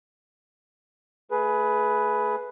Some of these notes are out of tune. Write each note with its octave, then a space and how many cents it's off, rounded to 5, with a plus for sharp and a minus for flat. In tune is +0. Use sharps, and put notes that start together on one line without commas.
A3 +0 G#4 +25 B4 +0